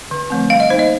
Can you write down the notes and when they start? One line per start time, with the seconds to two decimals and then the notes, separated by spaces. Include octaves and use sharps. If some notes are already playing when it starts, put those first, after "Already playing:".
0.11 D3
0.30 F3 A3 C4
0.50 G3 F5
0.60 D#5
0.70 A#3 D#4 C5
0.79 D#5